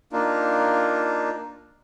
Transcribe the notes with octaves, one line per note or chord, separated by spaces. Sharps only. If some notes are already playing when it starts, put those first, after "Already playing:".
A#3 D4 D#4 F4